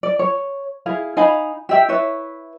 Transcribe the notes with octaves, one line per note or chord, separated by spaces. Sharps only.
D5
C#5
E4 G#4 F5
D#4 F5 G#5 B5
G4 E5 G5
E4 B4 C#5 E5